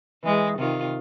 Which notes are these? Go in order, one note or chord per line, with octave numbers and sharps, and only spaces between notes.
E3 G#3
C3 D#3 F4